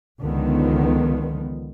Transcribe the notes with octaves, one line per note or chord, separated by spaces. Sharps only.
C#2 D3 D#3 F3 B3